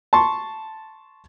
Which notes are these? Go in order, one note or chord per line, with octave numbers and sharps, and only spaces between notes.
A5 C6 C#6